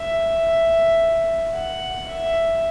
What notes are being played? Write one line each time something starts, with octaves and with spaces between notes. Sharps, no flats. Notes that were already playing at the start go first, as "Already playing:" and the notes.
Already playing: E5
F#5
E5